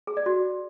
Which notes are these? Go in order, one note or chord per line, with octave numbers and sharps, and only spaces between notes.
G#4
D5
F#4